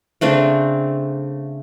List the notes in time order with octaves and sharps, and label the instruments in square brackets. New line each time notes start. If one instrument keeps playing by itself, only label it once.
[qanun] C#3 A3 C4 D4